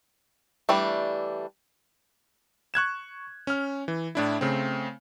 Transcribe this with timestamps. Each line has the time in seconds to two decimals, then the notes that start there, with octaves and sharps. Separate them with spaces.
0.69 E3 G3 A3 D4
2.74 C#6 F#6 G#6 E7
3.47 C#4 F6
3.88 E3
4.15 A2 D4 E4
4.41 C#3 A3 C4